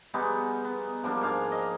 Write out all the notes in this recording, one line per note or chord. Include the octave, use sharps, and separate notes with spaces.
G3 G#3 B3 D#4
B3
F3 G3 A#3 D4
G#2 F5 G#5
D#5